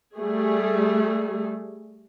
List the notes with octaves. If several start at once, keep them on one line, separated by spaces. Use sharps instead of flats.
G3 A3 G#4